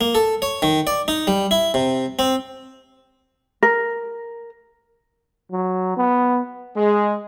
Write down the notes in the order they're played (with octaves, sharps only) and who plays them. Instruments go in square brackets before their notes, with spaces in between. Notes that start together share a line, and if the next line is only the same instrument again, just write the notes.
[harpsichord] A#3
A4
C#5
D#3
D5
D#4
G3
E4
C3
C4
[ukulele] A#4
[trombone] F#3
B3
[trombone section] G#3